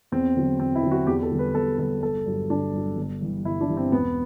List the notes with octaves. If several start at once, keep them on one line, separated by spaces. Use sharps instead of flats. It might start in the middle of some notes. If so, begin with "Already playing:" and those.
E2 C4
D3 F#3
E2 C4
E4
D3 F#3
F#4
E2 G4
A4
D3 G3
B4
E2 A4
D3 G3 A4
G1 A4
G2 F#3
G1 D4
G2 F#3
G1
G2 E3 G3
G1 E4
D4
G2 E3 G3
C4
E1 B3